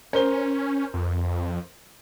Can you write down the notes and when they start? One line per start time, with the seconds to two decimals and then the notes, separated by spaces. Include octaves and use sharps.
0.13 C#4 A#4 C5 G7
0.94 F2